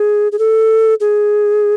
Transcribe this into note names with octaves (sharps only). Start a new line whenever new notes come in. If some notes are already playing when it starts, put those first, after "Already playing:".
Already playing: G#4
G#4
A4
G#4